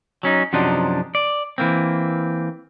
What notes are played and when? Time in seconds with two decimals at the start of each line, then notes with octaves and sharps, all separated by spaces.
0.23 F#3 C#4 D#4
0.53 F#2 C3 F3 F#3 D4 D#4
1.15 D5
1.58 E3 A#3 C4